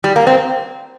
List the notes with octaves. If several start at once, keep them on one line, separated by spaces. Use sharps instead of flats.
G3
A#3
C4